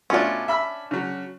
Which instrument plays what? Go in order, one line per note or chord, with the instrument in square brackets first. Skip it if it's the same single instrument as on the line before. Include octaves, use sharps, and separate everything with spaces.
[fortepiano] B2 A3 F4 [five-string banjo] C#4 D4
[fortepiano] E5 B5 E6
C#3 F#3